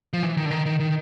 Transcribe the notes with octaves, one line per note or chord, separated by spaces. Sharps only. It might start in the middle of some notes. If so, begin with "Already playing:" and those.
F3
E3
D#3
D3
D#3
D#3
D#3